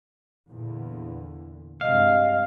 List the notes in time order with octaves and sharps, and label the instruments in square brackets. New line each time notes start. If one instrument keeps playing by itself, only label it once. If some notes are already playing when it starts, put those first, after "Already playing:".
[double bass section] E2 A#2 D3
[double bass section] G2 C3 G#3 [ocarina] D#5 [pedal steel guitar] F5